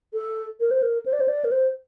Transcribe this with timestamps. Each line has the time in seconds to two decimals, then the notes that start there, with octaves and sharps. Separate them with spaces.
0.13 A4
0.60 A#4
0.71 C5
0.82 A#4
1.06 C5
1.13 D5
1.20 C5
1.28 D5
1.44 A#4
1.51 C5